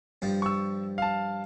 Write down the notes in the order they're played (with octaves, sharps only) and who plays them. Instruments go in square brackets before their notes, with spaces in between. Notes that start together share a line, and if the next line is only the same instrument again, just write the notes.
[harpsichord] G2 F3
[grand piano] C#6 E6
F5 A5